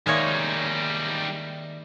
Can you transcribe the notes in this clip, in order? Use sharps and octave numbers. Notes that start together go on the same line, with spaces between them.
D#3 G3 G#3 A#3 D#4 C#5 D5 E5